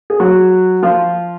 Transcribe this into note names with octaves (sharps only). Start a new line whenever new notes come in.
G#4
F#3 F#4
F3 F4